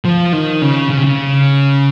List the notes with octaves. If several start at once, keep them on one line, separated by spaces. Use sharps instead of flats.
F3
D#3
C#3
C#3
C3
C#3